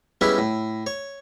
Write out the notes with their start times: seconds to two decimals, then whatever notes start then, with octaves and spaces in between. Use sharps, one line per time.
0.21 G3 G#3 B3 C#4 E4
0.38 A2
0.87 C#5